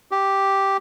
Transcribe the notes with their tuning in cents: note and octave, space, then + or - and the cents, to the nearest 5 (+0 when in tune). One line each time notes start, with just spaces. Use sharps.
G4 -5